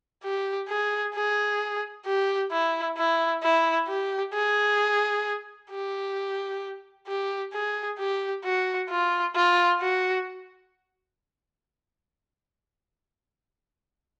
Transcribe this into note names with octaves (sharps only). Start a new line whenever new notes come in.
G4
G#4
G#4
G4
E4
E4
E4
G4
G#4
G4
G4
G#4
G4
F#4
F4
F4
F#4